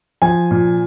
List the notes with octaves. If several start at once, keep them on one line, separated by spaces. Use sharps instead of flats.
F3 G#5
A#2